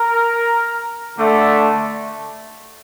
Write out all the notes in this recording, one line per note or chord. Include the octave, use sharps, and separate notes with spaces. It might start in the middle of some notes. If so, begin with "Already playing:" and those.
Already playing: A#4
D3 A3